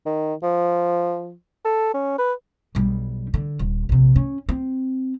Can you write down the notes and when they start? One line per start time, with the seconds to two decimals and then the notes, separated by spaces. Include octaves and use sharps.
0.06 D#3
0.43 F3
1.65 A4
1.94 C#4
2.18 B4
2.75 B1 G3
3.34 D3
3.59 D#1
3.89 A#1 C3
4.16 C#4
4.49 C4